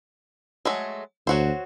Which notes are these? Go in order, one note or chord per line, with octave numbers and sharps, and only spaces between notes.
F#3 G#3 A3
D2 F#3 F#4 C5